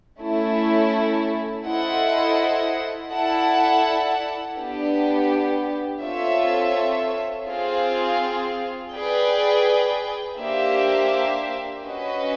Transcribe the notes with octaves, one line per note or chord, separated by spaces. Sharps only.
A3 C#4 E4 A4
E4 A4 C5 D#5 F#5
E4 A4 D5 F#5 A5
B3 D4 G4
C4 F4 A4 C#5 E5
C4 F4 G#4
G#4 B4 D5 G5
A#3 D4 G4 C5 E5
C#4 F#4 B4 D#5